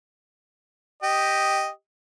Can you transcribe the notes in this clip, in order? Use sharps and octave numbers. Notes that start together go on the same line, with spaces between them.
G4 D#5